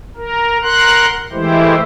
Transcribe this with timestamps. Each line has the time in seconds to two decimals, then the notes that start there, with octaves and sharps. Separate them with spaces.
0.17 A#4
0.63 A#4 F#5 C6 F#6
1.32 E3 G#3 A3 E4 G4 C5